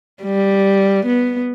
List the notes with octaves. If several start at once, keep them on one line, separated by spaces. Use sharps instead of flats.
G3
B3